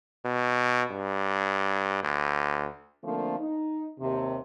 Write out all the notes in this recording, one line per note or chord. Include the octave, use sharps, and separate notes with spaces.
B2
G2
D2
D3 F3 A3 A#3 C4
D#4
D#2 C3